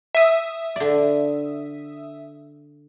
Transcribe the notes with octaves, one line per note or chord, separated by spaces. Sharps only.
E5 D#6
D3 D5